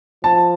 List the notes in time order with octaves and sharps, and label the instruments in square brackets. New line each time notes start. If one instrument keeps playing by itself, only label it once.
[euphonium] F3 [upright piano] A5